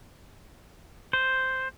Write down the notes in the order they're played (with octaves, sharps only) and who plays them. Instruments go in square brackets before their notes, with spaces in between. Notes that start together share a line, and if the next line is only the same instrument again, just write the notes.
[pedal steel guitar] C5